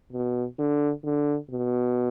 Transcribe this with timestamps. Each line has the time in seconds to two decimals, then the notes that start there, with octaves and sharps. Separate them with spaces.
0.13 B2
0.59 D3
1.05 D3
1.51 B2